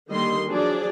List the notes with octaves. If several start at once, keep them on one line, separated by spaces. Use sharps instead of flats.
D3 D#3 G3 A#3 D#5 C6
F3 F#3 D4 G#4 D5